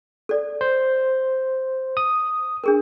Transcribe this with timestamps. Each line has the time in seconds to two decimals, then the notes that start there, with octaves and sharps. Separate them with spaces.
0.29 A4 D5
0.61 C5
1.97 D#6
2.64 D4 G#4 A#4